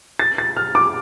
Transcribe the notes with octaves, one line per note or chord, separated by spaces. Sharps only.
A6
A6
F6
D6